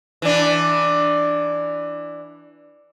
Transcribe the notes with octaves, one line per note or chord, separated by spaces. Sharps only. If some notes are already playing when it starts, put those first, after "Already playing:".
E3 D4